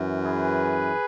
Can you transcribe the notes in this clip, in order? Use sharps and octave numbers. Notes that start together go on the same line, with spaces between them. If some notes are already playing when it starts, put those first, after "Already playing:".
Already playing: F#2 E3
G#4 B4